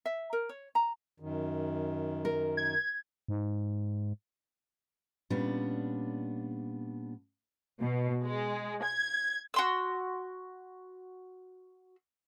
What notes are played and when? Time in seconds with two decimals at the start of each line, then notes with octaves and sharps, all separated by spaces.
0.05 E5
0.33 A#4
0.49 C#5
0.75 A#5
1.20 F#2 D#3
2.25 A#4
2.57 G#6
3.28 G#2
5.30 A#2 G3 B3 C#4 D4
7.81 B2
8.24 G#3
8.84 G#6
9.54 F#4 C6 E6